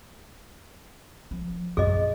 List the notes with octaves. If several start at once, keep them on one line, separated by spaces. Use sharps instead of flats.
F3
F#2 A#2 G#4 D#5